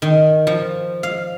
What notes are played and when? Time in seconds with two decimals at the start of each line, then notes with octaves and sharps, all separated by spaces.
0.02 D#3
0.47 F3
1.03 F5